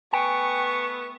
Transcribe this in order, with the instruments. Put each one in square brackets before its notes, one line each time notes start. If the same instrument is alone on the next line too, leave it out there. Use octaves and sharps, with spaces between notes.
[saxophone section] A3 B3 [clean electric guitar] G5 G#5 [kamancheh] C#6